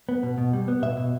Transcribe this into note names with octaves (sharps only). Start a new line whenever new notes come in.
B3
B2
B2
G3
B3
B2 E5
B2